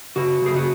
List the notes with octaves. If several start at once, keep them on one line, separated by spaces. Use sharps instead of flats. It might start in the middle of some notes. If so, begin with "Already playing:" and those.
C#3 F#4
C#3 G#4
F#4